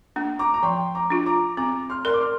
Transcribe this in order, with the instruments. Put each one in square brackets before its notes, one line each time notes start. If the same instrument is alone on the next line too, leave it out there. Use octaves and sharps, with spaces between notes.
[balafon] A#3 D4
[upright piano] A#5 D6
A#5
[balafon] F3 [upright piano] G5 C6
[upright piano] A#5 D6
[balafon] D4 F4
[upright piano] A#5 D6
[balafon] C4 [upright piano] A#5 D6
[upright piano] C6 F6
[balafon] A#4 D5 [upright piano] C6
[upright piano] D6
C6 F6